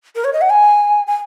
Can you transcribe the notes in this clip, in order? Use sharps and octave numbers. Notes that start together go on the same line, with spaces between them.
A#4
C#5
D#5
F#5
G#5
G#5